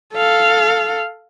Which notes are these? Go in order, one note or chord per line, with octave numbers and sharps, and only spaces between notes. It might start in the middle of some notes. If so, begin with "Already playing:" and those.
A4 F5